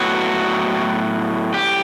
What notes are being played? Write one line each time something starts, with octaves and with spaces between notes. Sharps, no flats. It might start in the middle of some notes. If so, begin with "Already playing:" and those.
Already playing: A2 F#3 B3 F#4
G4